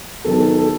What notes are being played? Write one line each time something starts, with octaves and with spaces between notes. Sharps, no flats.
D#3 F#3 B3 A4
A4
A4
A4